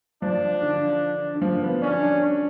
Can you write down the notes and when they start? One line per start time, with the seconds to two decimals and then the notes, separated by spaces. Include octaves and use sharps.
0.22 F3 D4
0.62 D3
1.35 D3
1.42 F3
1.62 B3
1.82 C#4 D4
2.02 D4
2.22 C#4